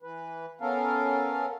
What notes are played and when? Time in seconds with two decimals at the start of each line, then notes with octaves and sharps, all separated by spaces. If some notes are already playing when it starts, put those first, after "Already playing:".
0.03 E3 B4
0.61 B3 C#4 A4 A#4 F5